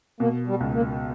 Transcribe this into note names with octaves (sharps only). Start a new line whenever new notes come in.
B2 A#3
G3
C#2
A#3